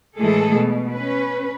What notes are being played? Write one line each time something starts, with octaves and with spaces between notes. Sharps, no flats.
A2 E3 G#3 A3 G#4 A4
B2
C#4 B4